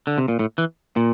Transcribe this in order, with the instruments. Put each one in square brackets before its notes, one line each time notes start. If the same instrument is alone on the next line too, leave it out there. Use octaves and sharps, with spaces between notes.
[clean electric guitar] D3
C3
A#2
A2
E3
A#2